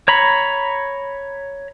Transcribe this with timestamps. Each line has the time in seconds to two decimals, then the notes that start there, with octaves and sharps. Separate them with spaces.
0.08 C#5 A#5 B5